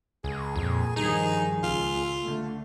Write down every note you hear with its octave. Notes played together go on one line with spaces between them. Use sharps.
C#2 G#4
F2 A#2
G2 D#3 F3 D#4 G#4
C#2 F4
D3 A3